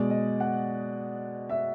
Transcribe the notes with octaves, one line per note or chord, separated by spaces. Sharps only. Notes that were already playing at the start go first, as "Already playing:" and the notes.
Already playing: B2 G#3 D5
D#5
F#5
E5